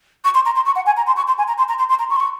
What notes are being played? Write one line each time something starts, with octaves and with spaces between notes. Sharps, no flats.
C#6
C6
A#5
C6
C#6
F#5
G#5
A#5
C6
C#6
C6
G#5
A#5
C6
A#5
C6
C6
A#5
C#6
C6
C#6